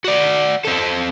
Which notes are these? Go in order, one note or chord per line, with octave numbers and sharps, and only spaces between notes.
F#4 D5
C4 A4